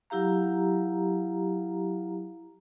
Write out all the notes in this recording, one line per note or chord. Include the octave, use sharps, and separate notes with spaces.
F#3 E4 G4 F5 A#5